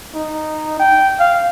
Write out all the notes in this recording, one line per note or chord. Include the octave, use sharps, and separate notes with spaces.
D#4
G5
F5